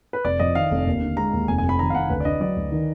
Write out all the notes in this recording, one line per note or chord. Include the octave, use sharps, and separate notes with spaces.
B4
F1 D5
F2 D#5
D#3 F5
F1
D#2
D3
G#3 A#5
D#2
F1 G#5
G#5
F2
B5
D#3 A#5
F5
F1 F#5
D2 B4
D5
D3 D#5
F#3 D5
D2
D#3